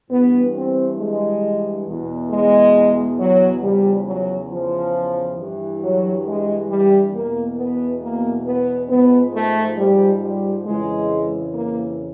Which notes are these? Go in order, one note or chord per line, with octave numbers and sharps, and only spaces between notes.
G2 E3 B3
C4
G#3
E2 B2
G#3
F#3
E2 C#3 F3 G3
F#3
F3
G2 E3
F#3
G#3
G3
E2 B2 A#3
B3
A#3
B3
G#2 F3 B3
A3
G3
G3
F2 C#3 E3 G#3
A#3